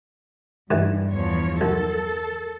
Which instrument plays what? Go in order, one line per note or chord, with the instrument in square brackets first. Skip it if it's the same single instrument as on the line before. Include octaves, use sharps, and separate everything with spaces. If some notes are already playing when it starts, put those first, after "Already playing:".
[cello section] G2 [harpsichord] D#3 E3 G3
[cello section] E2 F3 C#5
[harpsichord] B1 [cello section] A4 [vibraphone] A#4